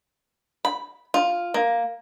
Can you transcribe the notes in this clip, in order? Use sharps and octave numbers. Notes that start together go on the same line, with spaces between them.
B5
F4
A#3